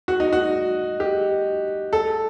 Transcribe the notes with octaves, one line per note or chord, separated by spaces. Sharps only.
F#4
D#4
F#4
G4
A4